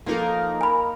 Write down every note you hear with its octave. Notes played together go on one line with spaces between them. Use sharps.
F3 A#3 D#4 F4 A4 A#4
G#5 B5